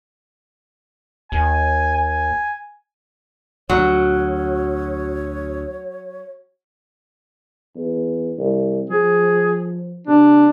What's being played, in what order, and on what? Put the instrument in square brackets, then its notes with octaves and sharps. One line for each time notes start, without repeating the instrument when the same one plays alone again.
[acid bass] D#2 [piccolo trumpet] G#5
[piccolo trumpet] G#5
[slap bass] D2 [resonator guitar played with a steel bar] F#3 [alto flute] C#5 [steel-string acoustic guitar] F#5
[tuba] E2
C2
[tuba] F3 [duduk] G#4
[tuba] C3 [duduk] D4